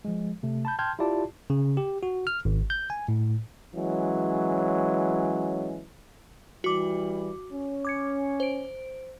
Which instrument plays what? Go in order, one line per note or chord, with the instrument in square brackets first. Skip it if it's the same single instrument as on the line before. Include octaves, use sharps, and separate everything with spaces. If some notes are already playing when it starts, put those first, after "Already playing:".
[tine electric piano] F3 G#3
C3 A3
A5 B5 G6
G5 A5 C6 F6 G6 G#6
E4 F4 G4 D5 A5
C#3
G4
F#4
F6
G#1
G6
G#5
A2
[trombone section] E3 F#3 G#3 C#4
[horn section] E3 G3 [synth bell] F#4 D6
[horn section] C#4
[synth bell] D6 G#6 C#7
C5 D7